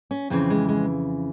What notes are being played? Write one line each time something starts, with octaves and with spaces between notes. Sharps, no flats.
C#4
F2 C#3 E3 C4
G#3
G#3